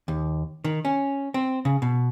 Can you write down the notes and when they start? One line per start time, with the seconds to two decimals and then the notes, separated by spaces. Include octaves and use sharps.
0.08 D#2
0.64 D#3
0.85 C#4
1.34 C4
1.65 C#3
1.82 B2